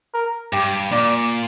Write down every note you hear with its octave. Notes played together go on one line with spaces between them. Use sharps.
A#4
G2 G4
A#2 D5